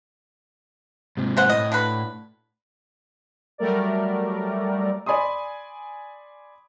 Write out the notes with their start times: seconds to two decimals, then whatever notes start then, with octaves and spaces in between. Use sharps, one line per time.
1.17 G#2 C3
1.37 C#3 C5 F#5
1.50 A2 D#5
1.72 D3 F#4 B4
3.58 F#3 G3 A3 A#4 D5
5.06 D5 G#5 B5 C6 D#6